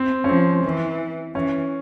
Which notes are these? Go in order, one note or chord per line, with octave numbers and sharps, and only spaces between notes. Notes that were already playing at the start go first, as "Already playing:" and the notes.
Already playing: C4
C#4
F3 C4
E3
E3 C#4